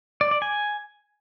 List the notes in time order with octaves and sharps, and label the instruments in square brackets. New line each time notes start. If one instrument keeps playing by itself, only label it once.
[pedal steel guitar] D5
D5
G#5